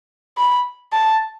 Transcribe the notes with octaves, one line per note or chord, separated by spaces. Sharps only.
B5
A5